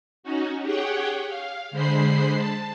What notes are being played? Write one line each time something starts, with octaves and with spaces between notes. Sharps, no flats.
C#4 D#4 F#4
G4 G#4 C#5 F#5 G5
F5
D3 G#3 C5 B5 C7
A5